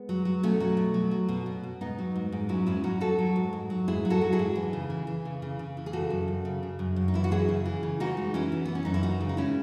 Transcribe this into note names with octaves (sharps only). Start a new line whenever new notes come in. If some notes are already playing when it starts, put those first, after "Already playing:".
Already playing: G#3 B3
F#3
F#3
B2 A3 C#4
F#3
B2
F#3
F#3
B2
B2
B2
G#2 B3 D#4
F#3
G#2
G#2
F#3 C#4 E4
G#2 C#4 E4
F#3 D#4 F#4
F#3 F#4 A4
F#3
G#2
G#2
F#3
G#2 E4 G#4
F#3
F#4 A4
F#3
E4 G#4
G#2
E3
C#3
E3
E3
C#3
C#3
C#3
E3
G#4
C#3 F#4 A4
F#2
F#2
C#3
C#3
F#2
F#2
D#4
E3 E4
F#4
F#2 E4 G#4
C#3
E3
C#3
E3 D#4 F#4
G#3
E3 C#4 E4
E3
E3 B3
C#4
F#2 D#4
E4
E3 D#4 F#4
C#3
D#4
G#3 C#4 E4